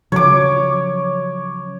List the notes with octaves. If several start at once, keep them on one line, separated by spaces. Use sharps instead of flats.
C#3 F3 F#3 C#5 D6